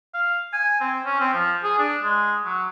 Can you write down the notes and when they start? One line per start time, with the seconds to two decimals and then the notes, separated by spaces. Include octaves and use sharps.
0.14 F5
0.53 G#5
0.81 C4
1.05 C#4
1.20 C4
1.33 F3
1.63 G#4
1.78 D4
2.03 G#3
2.45 F#3